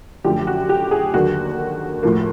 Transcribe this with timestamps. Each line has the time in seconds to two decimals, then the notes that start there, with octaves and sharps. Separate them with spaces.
0.24 F#2 D3 F3 A3 G4
0.47 F#4
0.69 G4
0.91 G#4
1.14 D#2 D3 F#3 A#3 F#4
2.03 A2 F3 A#3